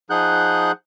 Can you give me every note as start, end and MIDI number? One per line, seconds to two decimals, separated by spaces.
0.10 0.72 53
0.10 0.72 63
0.10 0.72 68
0.10 0.72 78
0.10 0.72 90
0.10 0.72 91